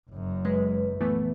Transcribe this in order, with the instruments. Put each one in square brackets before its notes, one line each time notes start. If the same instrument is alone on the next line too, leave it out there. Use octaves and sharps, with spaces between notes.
[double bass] F#1 F#2
[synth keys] G#3 [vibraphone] B4
[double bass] A#1 [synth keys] E3 A3 B3